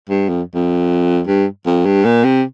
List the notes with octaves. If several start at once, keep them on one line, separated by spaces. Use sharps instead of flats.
G2
F2
F2
G2
F2
G2
A#2
C3